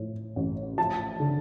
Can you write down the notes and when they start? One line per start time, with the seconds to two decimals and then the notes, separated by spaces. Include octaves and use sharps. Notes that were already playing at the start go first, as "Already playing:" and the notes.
Already playing: A2 F3
0.36 A1
0.78 F3 A5
1.20 D3